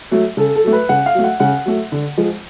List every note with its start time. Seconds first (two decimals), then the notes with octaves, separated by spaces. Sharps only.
0.11 F#3 A3
0.37 C#3 A4
0.55 A4
0.64 F#3 A3
0.72 B4
0.89 C#3 F#5
1.06 F5
1.15 F#3 A3
1.24 F#5
1.40 C#3 F#5
1.66 F#3 A3
1.92 D3
2.18 F3 G#3